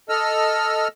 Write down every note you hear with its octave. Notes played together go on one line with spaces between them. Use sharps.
A4 D#5 E6 F6